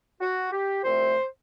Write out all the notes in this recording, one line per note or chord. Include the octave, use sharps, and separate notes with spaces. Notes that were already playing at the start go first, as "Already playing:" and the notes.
F#4
G4
C2 A#2 F3 A3 C4 C5